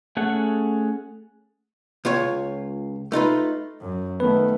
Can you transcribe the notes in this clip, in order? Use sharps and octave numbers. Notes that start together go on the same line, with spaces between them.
A3 C#4 G#4 A4 F#5
C#2 F4 C#5
A3 D#4 F4 B4
F#2
D#3 A3 B3 B4